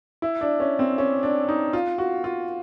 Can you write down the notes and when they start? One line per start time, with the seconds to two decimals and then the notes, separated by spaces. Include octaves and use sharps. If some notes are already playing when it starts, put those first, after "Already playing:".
0.22 E4
0.41 D4
0.60 C#4
0.79 C4
0.98 C#4
1.23 D4
1.49 D#4
1.73 F4
1.98 F#4
2.24 F4